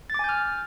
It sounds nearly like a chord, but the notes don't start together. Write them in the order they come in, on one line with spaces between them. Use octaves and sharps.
A6 D6 G#5 G6 F6